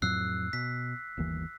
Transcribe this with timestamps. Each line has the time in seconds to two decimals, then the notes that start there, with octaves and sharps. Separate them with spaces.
0.02 F2 A2 F#3 E6 F#6 C7
0.53 B2 B6
1.17 G1 D#2 E3